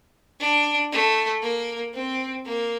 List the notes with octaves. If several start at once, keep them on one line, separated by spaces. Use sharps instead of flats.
D4
A3
A#3
C4
A#3